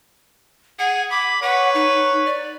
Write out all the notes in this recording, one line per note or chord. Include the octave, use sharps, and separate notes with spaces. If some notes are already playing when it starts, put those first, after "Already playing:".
G#4 F#5
B5 D6
B4 C#5 F#5
D#4
D5